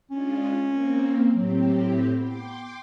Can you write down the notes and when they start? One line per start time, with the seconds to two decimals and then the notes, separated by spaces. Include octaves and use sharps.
0.11 G#3 C#4 D4 F4
0.64 A#3 C4
1.34 A2 F#3 C4 G4
2.17 B3 G5 C6 D6